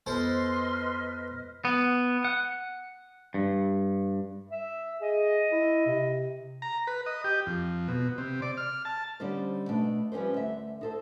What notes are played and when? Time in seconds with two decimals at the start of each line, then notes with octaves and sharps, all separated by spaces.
0.06 F2 B3 A4 B4 C5 D#5 C6 F6
1.65 B3
2.25 F#5
3.34 G2
4.51 E5
5.01 G#4 D#5
5.52 E4
5.87 C3
6.62 A#5
6.87 B4
7.06 D#5
7.24 G4
7.46 F2
7.88 B2
8.18 C3
8.42 D5
8.57 F6
8.85 A5
9.20 D3 G3 C#4 D#4 C5
9.69 B2 A3 D4
10.12 F3 G3 C#4 B4 C5
10.34 D2 E5
10.81 D#4 A4 C5